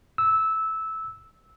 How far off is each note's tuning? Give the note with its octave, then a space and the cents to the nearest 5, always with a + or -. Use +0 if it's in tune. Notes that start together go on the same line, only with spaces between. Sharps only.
E6 -15